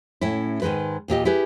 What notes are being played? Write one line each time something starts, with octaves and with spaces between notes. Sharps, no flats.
A2 C#4 E4
G#2 D#3 E3 G#3 B4
E2 A#2 G4 D#5
E4 G4 G#4 B4